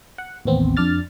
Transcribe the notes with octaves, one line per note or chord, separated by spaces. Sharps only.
F#5
A1 D#2 B3 C4
F2 D4 D5 F6 A6